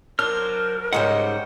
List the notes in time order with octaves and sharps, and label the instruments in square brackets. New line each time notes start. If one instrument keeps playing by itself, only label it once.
[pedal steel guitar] F#3 C5 F6 [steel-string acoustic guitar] D4 [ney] A#4
[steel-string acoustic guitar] G#2 C#3 G3 [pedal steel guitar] C5 F#5 [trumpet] D#5